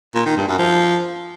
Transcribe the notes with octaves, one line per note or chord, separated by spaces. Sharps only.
A#2
D#3
G2
F#2
F3